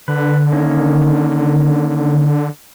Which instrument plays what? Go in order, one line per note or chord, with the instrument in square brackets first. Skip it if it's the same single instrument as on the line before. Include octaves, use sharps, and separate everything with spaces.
[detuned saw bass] D3 [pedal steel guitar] B4
[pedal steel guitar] D#3 A#3 C#4